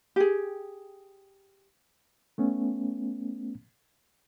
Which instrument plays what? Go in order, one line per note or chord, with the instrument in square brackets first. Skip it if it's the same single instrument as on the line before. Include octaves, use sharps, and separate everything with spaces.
[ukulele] G4 G#4
[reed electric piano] A3 B3 C#4